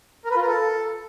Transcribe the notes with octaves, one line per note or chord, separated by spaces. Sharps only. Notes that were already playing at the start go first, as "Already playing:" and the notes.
A#4
B4
F4
A#4
A4